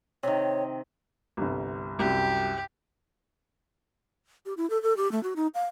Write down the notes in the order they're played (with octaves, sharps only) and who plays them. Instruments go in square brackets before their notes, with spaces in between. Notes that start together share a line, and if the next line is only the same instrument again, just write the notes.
[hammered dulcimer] C3 D#3 [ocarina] C#5
[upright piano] G1 C2
[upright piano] C2 F#2 [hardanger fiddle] G4
[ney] G4
E4
A4
A4
G4
A3
F#4
D#4
F5